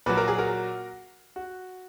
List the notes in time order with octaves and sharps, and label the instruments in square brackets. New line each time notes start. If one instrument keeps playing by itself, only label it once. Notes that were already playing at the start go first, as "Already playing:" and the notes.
[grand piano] A#2 F#3 B4
A#4
G#4
F#4 A#4
F#4